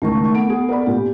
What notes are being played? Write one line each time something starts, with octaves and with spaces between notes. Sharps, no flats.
C#2 D#3 A3 A#4 C#6
B3 A4 F#5 D7
G#4
A#4 D5 B5
A#2 G4